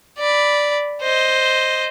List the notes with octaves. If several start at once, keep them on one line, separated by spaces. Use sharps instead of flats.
D5 B5
C5 D#5